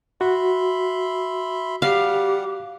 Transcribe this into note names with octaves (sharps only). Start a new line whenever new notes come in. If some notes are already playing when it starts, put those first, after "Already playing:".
F#4 E5 B5 C6
G3 G4 F5 F#5